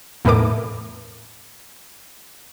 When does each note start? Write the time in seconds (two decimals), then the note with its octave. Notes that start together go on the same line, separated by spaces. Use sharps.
0.25 E2 A2 E3 D#4 A#4 D6